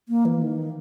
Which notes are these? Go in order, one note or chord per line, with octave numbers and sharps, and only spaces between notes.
A#3
E3
D#3